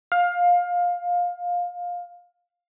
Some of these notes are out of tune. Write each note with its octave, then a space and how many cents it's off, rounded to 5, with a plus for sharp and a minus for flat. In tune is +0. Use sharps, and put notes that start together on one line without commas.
F5 +20